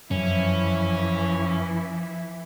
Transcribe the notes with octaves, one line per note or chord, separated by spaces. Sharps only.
F#2 E3 F3 C#4 E4